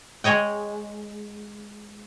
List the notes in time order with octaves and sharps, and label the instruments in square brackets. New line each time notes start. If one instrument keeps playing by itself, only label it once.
[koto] G#3 G#4 C#5 D#5 G5